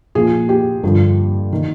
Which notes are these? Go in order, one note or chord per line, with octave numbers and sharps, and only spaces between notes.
A#2 F3 G#4
G4
G2 D3 F3
D#3